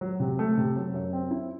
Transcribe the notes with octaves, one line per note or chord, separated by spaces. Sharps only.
F#3
C3
A3
C3
F#3
F#2
C4
E4